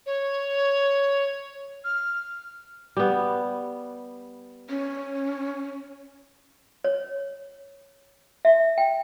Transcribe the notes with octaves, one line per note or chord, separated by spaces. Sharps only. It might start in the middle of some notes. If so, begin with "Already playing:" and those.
C#5
F6
G3 B3
C#4
C#5
E5
G5